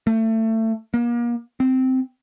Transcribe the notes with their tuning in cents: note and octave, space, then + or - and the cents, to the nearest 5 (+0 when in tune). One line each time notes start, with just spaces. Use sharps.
A3 +25
A#3 +35
C4 -10